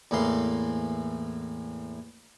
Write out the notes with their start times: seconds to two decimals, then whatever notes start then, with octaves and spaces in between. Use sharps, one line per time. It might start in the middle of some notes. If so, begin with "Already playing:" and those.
0.11 E2 A2 E3 A#3 C6